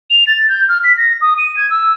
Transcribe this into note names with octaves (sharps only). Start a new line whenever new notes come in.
F7
A6
G6
F6
B6
A#6
D#6
D#7
G#6
E6